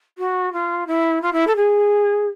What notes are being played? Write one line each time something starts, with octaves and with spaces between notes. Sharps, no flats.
F#4
F4
E4
F4
E4
A4
G#4